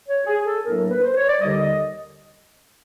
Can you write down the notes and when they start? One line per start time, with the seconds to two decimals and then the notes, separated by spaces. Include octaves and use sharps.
0.08 C#5
0.26 G#4
0.45 A4
0.65 A2 F#3 A#3 D4 A#4
0.78 A#4
0.90 B4
1.03 C5
1.16 C#5
1.28 D5
1.41 D#2 D3 G3 D#5
1.60 D#5